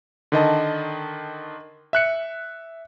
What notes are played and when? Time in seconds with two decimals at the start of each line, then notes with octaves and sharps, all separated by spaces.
0.32 D3 D#3 D#5 A5
1.93 E5 F#6 C#7